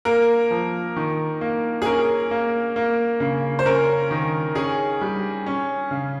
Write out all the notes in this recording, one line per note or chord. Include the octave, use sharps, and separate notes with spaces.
A#3 A#4
F3
D#3
A#3
G#4
C#4 A#4
A#3
A#3
C#3
C5
C#4 A#4
D#3
C#4 G#4
G3
C#4
C#3